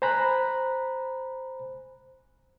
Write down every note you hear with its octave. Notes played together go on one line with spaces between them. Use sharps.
C5 G#5 A#5 B5 F#6